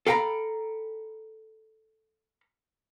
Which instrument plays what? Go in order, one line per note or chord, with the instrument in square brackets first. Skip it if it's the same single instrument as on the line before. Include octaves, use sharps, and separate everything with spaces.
[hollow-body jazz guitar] A4 F5 G5 G#5 A#5 B5